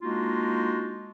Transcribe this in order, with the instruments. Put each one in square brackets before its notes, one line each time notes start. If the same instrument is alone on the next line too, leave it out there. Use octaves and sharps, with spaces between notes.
[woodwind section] G#3 A#3 D4 D#4 F4 F#4